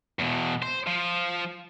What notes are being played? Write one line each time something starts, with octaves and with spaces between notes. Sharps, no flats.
E2 B2
C5
F3